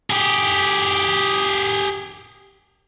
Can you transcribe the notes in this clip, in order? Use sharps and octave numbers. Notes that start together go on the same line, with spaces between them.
G4 G#4